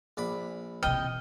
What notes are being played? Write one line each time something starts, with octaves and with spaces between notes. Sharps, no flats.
A#1 D5 B5
C3 E3 D#5 G5 F6